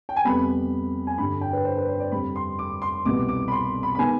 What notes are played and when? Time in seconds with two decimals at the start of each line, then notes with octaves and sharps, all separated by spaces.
0.09 G5
0.16 G#5
0.25 F2 C3 G3 B3 B5
1.07 G#5
1.18 G2 D3 G3 B5
1.41 G5
1.53 B4
1.65 C5
1.77 B4
1.88 C5
2.00 D5
2.12 F2 C3 G3 B5
2.36 C6
2.59 D6
2.82 C6
3.05 C2 B2 G3 B3 D6
3.29 D6
3.48 B5
3.52 C6
3.83 B5
3.95 B5
3.98 D#3 G#3 B3 G#5